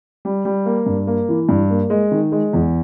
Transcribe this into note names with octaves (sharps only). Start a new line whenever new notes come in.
G3
G3
A#3
G2
A#3
E3
G2
A#3
G#3
D#3
G#3
E2